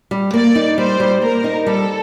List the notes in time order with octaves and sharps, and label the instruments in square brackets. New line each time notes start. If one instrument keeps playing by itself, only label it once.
[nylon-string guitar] G3
[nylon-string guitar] A#3 [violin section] D5
[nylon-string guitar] D#4
[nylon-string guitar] G3 [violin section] C5
[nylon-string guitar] G3
[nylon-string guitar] A#3 [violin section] A#4
[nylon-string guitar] D#4
[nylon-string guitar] G3 [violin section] A4